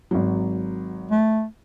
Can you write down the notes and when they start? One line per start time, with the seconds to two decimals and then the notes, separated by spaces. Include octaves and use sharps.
0.11 G#1 F#3
1.11 A3